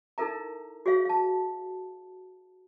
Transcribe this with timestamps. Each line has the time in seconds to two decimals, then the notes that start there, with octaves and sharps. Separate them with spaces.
0.18 D#4 E4 A4 A#4 E5 A#5
0.86 F#4 G#4 C#5 E5 F5
1.05 F5 A5